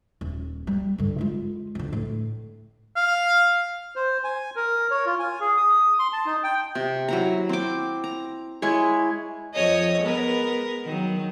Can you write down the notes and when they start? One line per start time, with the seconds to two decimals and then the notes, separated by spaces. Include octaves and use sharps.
0.21 D#1
0.67 G3
0.98 G2 D3
1.18 G#3 F4
1.75 F2 D3
1.93 A2
2.96 F5
3.96 C5
4.24 G#5
4.56 A#4
4.91 C#5
5.06 F4
5.19 G#5
5.40 G#4
5.57 D#6
5.99 C6
6.13 A5
6.26 D#4
6.44 G5
6.75 C3
7.08 F#3 E4 A#5
7.49 C4 D6
8.04 A#5
8.62 G#3 E4 C#5
9.54 F2 C#5 D#5
10.02 G#3 B3 A#4
10.85 D#3 F#3